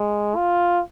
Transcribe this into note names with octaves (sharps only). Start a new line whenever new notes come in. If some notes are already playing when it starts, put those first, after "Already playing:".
Already playing: G#3
F4